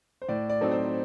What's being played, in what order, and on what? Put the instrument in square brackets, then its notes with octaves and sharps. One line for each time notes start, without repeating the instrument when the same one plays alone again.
[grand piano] C5
[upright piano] A2 [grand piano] D5
[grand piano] D5
[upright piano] F#3 C4 D#4 A4
[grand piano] C5